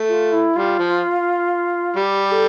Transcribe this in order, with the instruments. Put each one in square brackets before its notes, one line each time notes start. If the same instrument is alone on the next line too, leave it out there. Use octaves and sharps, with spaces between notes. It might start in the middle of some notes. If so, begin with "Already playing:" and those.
Already playing: [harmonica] A3
[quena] F4
E4
[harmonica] G3 [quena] F4
[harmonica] F3
[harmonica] G3 [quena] G4
[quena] A4